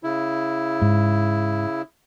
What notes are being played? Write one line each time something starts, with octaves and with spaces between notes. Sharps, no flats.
C#3 E4
G#2